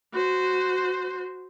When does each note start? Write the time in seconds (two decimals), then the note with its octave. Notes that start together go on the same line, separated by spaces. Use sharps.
0.13 F#4 C5